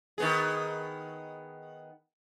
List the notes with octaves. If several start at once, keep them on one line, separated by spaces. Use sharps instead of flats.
D#3 B3 G#4